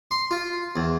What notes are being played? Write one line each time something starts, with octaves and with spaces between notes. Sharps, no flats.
C6
F4
E2